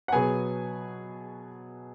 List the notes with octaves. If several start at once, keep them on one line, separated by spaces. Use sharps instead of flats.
F#5
B2 F#3 B3 G#4 G#5